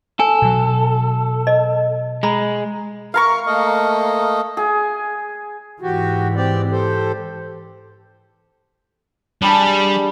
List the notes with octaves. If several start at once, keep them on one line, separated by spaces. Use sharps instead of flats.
A4 G#5
B2 F#3
D#5
G#3 A#5 B5
A#4 F5 A#5 C#6
A3 A#3 D#5
G#4
G#2 E3 F#4 G4
C4 G4 D5
G4 A4 C5
G3 D4 G4 G#4 B5